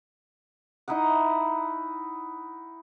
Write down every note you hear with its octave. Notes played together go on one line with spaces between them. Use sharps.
D#4 E4 D#5 F#5